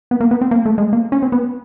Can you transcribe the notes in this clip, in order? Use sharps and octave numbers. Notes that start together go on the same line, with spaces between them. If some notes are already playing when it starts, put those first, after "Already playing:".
B3
A#3
B3
C4
A#3
A3
G#3
A#3
C#4
C4
B3